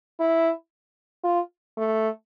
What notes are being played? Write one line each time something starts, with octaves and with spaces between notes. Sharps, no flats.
E4
F4
A3